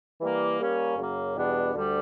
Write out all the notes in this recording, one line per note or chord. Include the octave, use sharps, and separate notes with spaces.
E3 G3 A#3
G3 A#3 C#4
F#2 C#3 F#3 A#3
E2 B2 G3 B3 D4
D2 D3 G3